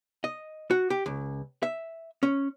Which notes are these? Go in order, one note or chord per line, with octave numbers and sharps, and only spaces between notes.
D#5
F#4
G4
C#2
E5
C#4